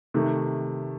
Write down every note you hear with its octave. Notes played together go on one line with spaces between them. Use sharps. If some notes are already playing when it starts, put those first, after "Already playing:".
C3 D#3 A3